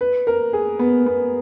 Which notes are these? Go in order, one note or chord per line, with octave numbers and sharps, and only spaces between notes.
B4
A#4
G#4
B3
B3